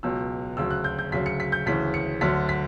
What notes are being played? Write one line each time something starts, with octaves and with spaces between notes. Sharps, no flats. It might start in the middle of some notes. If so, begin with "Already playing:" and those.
C#2 B2 F#3 E6
D2 C#3 F#3 E6
F#6
G6
G6
D2 C#3 F#3 B6
C#7
B6
G6
D2 C#3 E3 B6
C#7
D2 D3 F#3 B6
B6